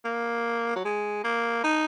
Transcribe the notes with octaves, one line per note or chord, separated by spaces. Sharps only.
A#3
F#3
G#3
A#3
D#4